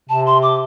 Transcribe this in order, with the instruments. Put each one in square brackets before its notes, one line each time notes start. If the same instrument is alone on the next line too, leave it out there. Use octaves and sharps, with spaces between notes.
[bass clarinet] C3 [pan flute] A5
[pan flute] C6
D6